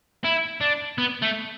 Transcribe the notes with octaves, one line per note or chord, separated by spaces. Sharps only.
E4
D4
B3
A3